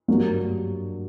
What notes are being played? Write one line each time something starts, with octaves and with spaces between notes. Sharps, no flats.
G2 F#3 A#3